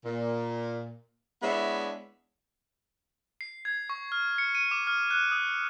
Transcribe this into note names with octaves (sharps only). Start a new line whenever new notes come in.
A#2
G#3 B3 D4 E4 C#5 E5
C7
G#6
C#6
F6
C#7
D#7
D6
F6
F#6
D#6